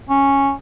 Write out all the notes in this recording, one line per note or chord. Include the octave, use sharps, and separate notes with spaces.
C#4